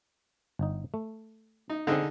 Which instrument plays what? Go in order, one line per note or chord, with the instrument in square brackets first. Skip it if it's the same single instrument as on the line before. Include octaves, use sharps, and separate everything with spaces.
[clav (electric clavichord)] G1 D#4
A3
[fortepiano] D#4
[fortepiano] D3 D#4 G#4 [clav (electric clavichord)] C4 A4